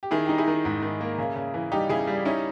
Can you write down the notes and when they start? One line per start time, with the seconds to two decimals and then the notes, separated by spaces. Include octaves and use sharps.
0.03 G4
0.11 D#3 E4 G#4
0.26 D#4 G4
0.38 E4 G#4
0.48 D#3
0.65 G#2
0.83 D#3
1.01 A#3
1.18 C#3
1.36 C#3
1.54 E3
1.72 G3 D#4 G4
1.89 C#3 E4 G#4
2.07 G3
2.25 C#4 D#4 E4